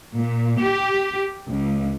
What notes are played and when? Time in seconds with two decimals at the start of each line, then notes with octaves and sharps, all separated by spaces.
0.16 A#2
0.60 G4
1.49 C#2